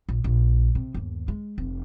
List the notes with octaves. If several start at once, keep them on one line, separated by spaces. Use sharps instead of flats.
A#1
A#1
C3
G1 D#2
G#3
F1